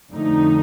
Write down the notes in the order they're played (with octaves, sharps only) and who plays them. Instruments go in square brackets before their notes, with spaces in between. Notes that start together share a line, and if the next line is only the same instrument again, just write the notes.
[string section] F2 D3 A3 D#4